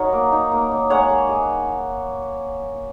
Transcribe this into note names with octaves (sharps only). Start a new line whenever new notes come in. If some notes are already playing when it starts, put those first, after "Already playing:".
Already playing: F#3 D#4 A#4 C#5 D#5 F#5
A#3
D#4
A#3
D#4
G#3 C#5 F#5
G#3
G#3